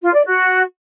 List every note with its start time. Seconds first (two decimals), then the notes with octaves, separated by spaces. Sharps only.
0.02 F4
0.14 D5
0.25 F#4